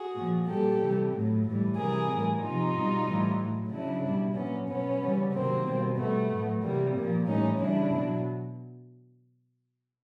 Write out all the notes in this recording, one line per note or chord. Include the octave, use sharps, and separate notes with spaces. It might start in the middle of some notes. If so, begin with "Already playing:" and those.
Already playing: F#4 G#4
A#2 F3
A#2 G3 G4 A4
C3 E3 G3
A2 F#3
A2 E3 G3
C3 E3 G3 G#4 A#4
A2 E3 G3
C3 F3 D#4 F4
B2 G3
A2 E3 G3
A2 F#3
C#3 F#3 D4 E4
B2 G3
A#2 F#3 B3 C#4
B2 F#3 B3 C#4
C#3 E3 G3
C3 D#3 F#3 A#3 C4
B2 G3
B2 G3 A3 B3
A2 F#3
C3 E3 G3 A#3
A#2 F3 A#3
A2 E3 G3 C#4 D#4
C#3 E3 G3 D4 E4
B2 F#3